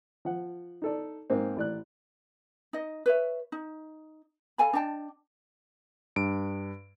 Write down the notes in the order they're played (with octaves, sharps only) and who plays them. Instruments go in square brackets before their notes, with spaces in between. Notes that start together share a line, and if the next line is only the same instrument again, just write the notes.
[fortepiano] F3 F#5
D#4 A4 D5
G#2 A#3 C4
A1 D5 F#6
[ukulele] D#4 D#5
B4 C#5 E5
D#4
A4 F5 G#5 B5
D4 D#5 G5 A5
[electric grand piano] G2 D7